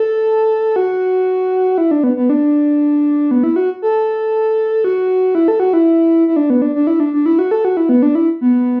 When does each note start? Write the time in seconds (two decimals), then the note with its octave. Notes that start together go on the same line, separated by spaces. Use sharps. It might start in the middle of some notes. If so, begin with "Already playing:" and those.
Already playing: A4
0.76 F#4
1.78 E4
1.91 D4
2.04 B3
2.16 B3
2.30 D4
3.31 B3
3.44 E4
3.56 F#4
3.82 A4
4.84 F#4
5.35 E4
5.48 A4
5.60 F#4
5.73 E4
6.28 E4
6.36 D4
6.50 B3
6.62 D4
6.75 D4
6.87 E4
7.00 D4
7.13 D4
7.26 E4
7.39 F#4
7.51 A4
7.65 F#4
7.77 E4
7.89 B3
8.03 D4
8.15 E4
8.41 B3